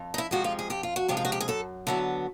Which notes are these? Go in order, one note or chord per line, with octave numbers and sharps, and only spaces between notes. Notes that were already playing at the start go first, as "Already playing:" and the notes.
Already playing: F2
D#4
E4
C3 F3 G#3 F#4
F4
G#4
F2 G4
F4
F#4
C3 F3 G#3 G4
F4
F#4
G4
G#4
F#2 A4
D3 F#3 B3 E4